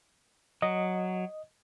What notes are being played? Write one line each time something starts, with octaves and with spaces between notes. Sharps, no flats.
F#3 D#5